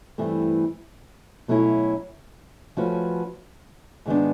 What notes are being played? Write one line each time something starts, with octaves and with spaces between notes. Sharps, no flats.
G2 E3 A3 C4
B2 F#3 A3 C#4 E4
F3 A3 C#4 F#4 B4
G#2 D#3 G#3 B3 D4